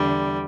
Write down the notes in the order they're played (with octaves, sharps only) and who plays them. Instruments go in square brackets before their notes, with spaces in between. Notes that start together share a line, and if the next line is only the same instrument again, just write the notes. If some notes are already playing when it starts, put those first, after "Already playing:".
Already playing: [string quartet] E2 D3 G3